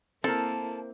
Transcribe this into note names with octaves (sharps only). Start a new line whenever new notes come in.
A#3 C4 E4 A4 A#4 A5